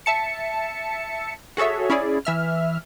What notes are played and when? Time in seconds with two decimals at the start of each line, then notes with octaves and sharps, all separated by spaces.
0.06 E5 A5 C#7
1.57 F#4 G#4 A4 C#5 E5
1.90 C#4 E4 G#4 D5
2.25 E3 E5 F6